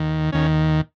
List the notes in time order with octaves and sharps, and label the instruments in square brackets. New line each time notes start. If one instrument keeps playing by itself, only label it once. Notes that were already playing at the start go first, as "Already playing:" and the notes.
Already playing: [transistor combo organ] D#2 D#3
D#2 D#3 C#4